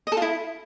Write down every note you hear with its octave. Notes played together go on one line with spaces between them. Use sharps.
D#5
A4
F4
E4